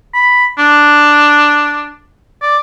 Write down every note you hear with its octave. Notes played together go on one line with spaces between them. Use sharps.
B5
D4
D5